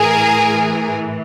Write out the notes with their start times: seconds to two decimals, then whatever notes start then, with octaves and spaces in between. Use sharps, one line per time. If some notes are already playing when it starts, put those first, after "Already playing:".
Already playing: A2 E3 G#4 A#4